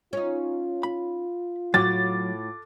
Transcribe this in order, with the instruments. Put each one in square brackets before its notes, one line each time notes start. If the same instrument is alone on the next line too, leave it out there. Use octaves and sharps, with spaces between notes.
[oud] C#4 D#4 [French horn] F4
[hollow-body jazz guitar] B5
[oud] A2 [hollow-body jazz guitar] F#3 [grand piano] D6 A6